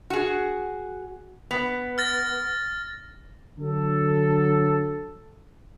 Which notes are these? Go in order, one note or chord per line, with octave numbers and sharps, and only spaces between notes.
F#4 G#4
B3
F6 A6 A#6
D3 F#3 A4